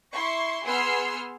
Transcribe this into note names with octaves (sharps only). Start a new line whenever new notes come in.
E4 C6 C#6
B3 G#4 C6 E6 F6